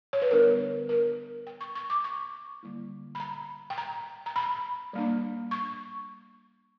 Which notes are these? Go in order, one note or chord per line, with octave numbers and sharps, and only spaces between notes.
C#5
B4
D3 G3 B3 D4 A#4
A#4
G5
C#6
C#6
D6
C#6
D3 G3 A#3 E4
B5
A#5
G5
A#5
A#5
B5
G3 A#3 D4
C#6